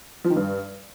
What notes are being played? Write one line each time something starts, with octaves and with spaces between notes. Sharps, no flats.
F3
D#3
G2